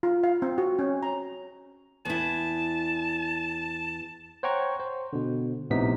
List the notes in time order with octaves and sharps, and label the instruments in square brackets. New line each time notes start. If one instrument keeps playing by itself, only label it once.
[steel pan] F4
F5
C4
F#4
C#4
A#5
[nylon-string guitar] E2 E4 [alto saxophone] A5
[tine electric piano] C5 C#5 F#5 G5 A#5 C#6
C5
B2 D3
A#1 A2 C3 B3 D#4 B6